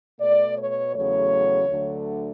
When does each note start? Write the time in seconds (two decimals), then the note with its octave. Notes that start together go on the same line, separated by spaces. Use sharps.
0.19 B2 A3 D5
0.56 C#5
0.93 E2 C#3 F#3 A3 C#5
1.68 D2 D3 F#3 A3